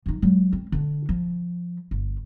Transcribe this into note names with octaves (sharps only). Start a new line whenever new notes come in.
F3 D#4
F#3 G#3
C4
D3 D4
F3
G1